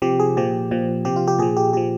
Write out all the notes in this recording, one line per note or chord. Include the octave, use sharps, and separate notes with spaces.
C3 F3 G4
G#4
A#2 F3 G4
A#2 F3
C3 F3 G4
F4
G4
A#2 F3 G#4
G4
A#2 F3 G4